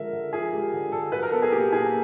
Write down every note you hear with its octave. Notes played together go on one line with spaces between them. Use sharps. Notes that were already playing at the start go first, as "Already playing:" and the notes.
Already playing: D3 F3 G#3 A#4 E5
D3
F3 G#4
G#3 G4
D3
D3 A4
F#3 B4
A#4
B3 A4
G#4
A#2 G4
A#2 G#4